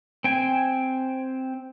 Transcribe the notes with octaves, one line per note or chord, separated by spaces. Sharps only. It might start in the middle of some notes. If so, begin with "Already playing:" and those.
C4 G5 G#5